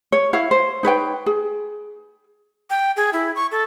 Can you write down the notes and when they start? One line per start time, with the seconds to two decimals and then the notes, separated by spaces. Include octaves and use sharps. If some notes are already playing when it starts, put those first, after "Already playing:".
0.12 C#5
0.33 E4 C#5 F5
0.51 C5
0.83 D#4 B4 C#5 G5
1.26 G#4
2.70 G5
2.97 G#4
3.13 E4
3.36 C#6
3.52 A4